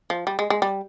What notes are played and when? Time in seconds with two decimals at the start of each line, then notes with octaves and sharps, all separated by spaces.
0.10 F3
0.27 G3
0.39 G#3
0.50 G#3
0.62 G3